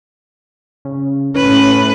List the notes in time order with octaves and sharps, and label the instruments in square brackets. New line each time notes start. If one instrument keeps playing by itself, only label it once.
[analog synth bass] C#3
[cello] A2 B4 [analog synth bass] C#4